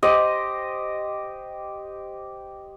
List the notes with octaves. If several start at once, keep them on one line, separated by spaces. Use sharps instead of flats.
G4 C5 D#5